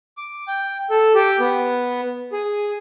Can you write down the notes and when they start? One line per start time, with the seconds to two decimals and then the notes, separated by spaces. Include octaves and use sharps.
0.17 D6
0.48 G5
0.90 A4
1.15 G4
1.40 B3
2.32 G#4